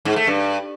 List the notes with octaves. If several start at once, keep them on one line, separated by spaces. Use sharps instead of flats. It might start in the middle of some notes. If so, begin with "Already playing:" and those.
G#2
A3
G2